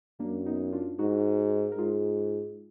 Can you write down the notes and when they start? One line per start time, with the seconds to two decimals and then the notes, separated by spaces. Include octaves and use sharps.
0.20 F#2 A#3 D4
0.46 B3 D#4
0.72 D4 F4
0.99 G#2 D#4 F#4
1.72 A#4
1.78 G#2 F4 G#4